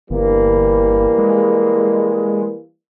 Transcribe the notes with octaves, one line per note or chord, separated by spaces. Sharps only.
G1 E3 G3 A#3
G#3